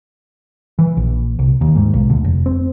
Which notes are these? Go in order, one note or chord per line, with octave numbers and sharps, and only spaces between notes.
E3
A#1
C2
D#2
G#2
B1
D2
F1
C4